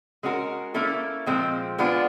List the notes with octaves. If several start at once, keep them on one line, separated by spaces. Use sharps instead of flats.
G#3 C#4 F#4 A#4
A#3 C#4 E4 A4
A#2 F3 G#3 C4
G#3 B3 D4 F4